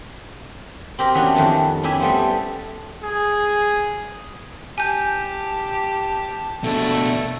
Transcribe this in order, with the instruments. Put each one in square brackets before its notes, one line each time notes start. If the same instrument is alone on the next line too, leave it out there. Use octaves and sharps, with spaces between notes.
[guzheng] C4 G4 A#4
E3 B3 C#4 D4 F#4
F2 D#3 G3
C#4 E4 G4 E5 G#5
G3 A3 B3 C4
[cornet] G#4
[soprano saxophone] G4 [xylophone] G#5 G6 [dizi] A5
[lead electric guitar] B2 D4 [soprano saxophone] A3 [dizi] A4